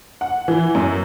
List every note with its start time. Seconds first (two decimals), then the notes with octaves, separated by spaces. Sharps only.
0.21 F#5
0.48 E3
0.75 F#2